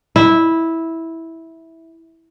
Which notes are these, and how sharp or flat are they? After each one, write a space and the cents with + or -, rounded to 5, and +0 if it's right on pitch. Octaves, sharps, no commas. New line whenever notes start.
E4 -10